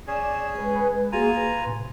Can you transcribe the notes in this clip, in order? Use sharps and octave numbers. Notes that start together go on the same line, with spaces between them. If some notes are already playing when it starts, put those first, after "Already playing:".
C#4 G#4 D5 E7
G#3 B4
A#3 F4 F#4 G#4 G#5 A#5
B4
A2 C3